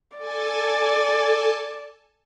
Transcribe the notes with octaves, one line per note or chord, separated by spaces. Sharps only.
A4 D5 G#5 A5